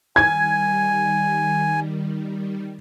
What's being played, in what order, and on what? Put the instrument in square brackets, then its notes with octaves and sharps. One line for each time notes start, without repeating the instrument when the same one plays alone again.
[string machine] D#3 G3 [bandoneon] G#5 [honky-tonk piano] G#6